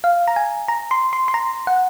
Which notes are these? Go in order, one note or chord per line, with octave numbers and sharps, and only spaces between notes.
F5
A#5
G#5
A#5
C6
C6
C6
A#5
F#5